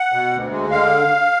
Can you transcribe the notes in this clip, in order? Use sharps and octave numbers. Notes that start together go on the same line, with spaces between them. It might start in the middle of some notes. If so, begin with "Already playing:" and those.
Already playing: F#5
B2
D2
G#3
D3 F5